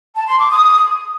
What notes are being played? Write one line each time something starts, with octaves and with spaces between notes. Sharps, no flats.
A5
C6
D6
D#6